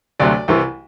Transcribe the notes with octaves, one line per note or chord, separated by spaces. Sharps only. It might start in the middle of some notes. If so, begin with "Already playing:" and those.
D2 C3 F#3 A3 D5
C2 C3 E3